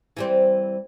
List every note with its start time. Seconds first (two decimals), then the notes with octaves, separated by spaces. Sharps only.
0.17 E3 G3 C4